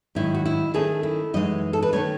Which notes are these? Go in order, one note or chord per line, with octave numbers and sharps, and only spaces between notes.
G#2 D#3 F#3 E4
F#4
E4
D#3 A3 C#4 G#4
E4
F#2 E3 G#3 D#4 D#5
A4
B4
D#3 A3 C#4 C#5